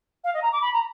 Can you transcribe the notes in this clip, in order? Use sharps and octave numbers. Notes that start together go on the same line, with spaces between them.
F5
D#5
A#5
D6
B5
A#5